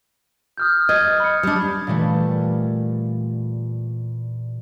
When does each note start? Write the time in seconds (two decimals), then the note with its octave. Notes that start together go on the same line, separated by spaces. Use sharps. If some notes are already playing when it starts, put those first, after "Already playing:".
0.58 D#6 F6 G6
0.89 D#5 G#6 A6
1.20 B5 C#7
1.43 G3 D4
1.87 A#2 E3 G3 A3